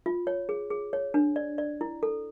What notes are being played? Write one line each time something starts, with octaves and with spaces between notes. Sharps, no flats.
F4
C#5
G#4
G#4
C#5
D4
D5
D5
E4
A4